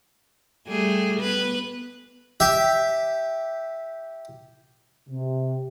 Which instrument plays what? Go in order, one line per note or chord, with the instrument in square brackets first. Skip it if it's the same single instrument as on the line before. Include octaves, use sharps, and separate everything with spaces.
[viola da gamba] G3 A3 G#4
B3 B4
[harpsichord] G4 E5
[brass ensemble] C3